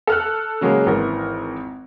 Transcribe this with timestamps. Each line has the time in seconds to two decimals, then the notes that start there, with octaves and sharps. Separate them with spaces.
0.07 A4 F6 F#6
0.61 C#3 F#3 G#3 A#3
0.86 G#1 E3 A#4